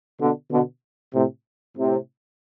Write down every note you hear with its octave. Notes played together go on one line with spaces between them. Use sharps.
B2 D3
B2 D3
A2 C3
A2 C3